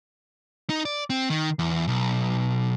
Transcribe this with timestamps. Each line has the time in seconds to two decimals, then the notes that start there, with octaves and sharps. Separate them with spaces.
0.70 D#4
0.85 D5
1.10 C4
1.30 D#3
1.59 E2
1.88 B1